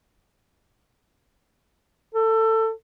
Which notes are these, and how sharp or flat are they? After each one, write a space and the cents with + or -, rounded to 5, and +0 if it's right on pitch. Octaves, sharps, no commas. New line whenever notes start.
A4 +20